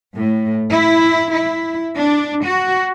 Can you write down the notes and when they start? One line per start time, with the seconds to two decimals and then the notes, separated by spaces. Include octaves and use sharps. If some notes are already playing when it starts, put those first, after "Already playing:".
0.16 A2
0.71 E4
1.31 E4
1.95 D4
2.44 F#4